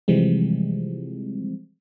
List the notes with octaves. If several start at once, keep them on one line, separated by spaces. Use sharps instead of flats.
C3 E3 F3 G3 G#3 C4